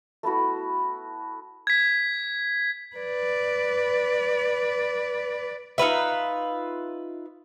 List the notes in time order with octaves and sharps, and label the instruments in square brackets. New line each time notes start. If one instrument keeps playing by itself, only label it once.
[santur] A3 B3 E4 F#4
[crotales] G#6 B6
[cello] B4 D5
[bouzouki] D#4 F4 B4 E5